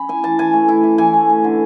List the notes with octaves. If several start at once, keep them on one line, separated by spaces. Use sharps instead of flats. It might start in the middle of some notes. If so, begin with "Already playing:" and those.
Already playing: C#4 B5
E4 G#5
E3 A5
E3 G#5
A3
E4
E3
E3 G#5
A3
C#4
D3